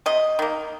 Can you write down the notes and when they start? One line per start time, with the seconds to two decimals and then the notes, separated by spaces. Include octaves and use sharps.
0.06 C3 D#5
0.39 D#3 A#3